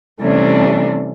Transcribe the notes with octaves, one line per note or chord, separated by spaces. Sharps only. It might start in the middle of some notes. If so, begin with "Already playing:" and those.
C3 E3 G3 A3 C#4 D4